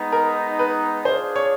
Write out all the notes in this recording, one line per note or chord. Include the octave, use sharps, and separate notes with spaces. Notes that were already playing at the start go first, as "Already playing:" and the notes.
Already playing: G#3 B3 D#4
A#4
B4
D4 F4 G#4 C5
C#5